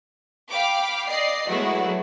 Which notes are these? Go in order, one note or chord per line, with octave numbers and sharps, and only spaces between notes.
F5 G5 B5 D6
D5 D#5 C7
F#3 G#3 A3 B3 E4 F#4